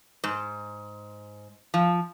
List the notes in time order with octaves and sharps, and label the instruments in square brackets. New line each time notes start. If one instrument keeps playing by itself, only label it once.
[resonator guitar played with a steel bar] G#2
F3